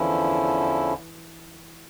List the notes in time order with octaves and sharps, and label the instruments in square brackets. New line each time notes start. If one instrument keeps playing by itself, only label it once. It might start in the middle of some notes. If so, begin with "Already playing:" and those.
Already playing: [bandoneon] E2 D3 F3 C#4 E4 [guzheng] E3